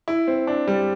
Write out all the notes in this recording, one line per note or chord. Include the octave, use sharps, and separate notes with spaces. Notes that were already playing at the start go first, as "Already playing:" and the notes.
E4
C4
D4
G3